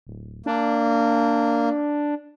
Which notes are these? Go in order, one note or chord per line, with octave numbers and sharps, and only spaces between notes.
D1
A#3 D4